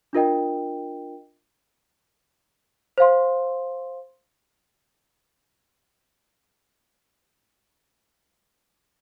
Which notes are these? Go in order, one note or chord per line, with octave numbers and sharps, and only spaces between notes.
D4 F4 A#4 D#5 G5
C5 F5 C6